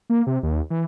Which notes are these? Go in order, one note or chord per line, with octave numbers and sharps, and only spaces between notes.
A#3
C3
D#2
E3